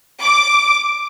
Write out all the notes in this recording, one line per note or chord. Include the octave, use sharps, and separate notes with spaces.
D6